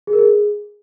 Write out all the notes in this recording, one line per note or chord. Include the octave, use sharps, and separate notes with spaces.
G#4
A#4
G#4